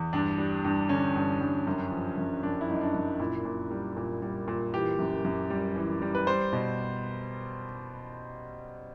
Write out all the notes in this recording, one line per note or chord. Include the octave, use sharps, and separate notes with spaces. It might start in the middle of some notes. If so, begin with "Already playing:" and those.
Already playing: E2
G2 D4
G3
G2
D3 C#4
G2
G2
F#2
F3
F#2
F#2 D4
E4
F#2 D#4
D4
F#2
A#2 E4
A#2
G3
A#2
G3
A#2
E3 G4
F#2
F#2
G3
E3
G3
B4
G3 C5
B2